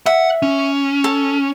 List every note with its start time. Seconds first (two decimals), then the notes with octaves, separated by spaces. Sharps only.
0.06 E5 F#5
0.42 C#4
1.04 A4